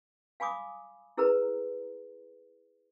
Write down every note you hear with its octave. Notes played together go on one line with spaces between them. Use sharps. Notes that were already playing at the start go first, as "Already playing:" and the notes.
F5 G#5 B5 D6 D#6
E4 G#4 A#4 B4 A#5